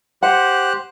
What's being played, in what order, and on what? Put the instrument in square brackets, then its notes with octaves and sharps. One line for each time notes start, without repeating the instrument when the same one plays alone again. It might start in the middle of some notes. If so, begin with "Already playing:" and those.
[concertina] G4 C5 F#6 [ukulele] F#5